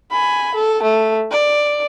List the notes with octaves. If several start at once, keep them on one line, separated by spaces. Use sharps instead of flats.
G#5 B5
A4
A3
D5